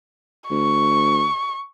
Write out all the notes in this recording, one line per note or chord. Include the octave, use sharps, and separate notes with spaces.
D2 C#6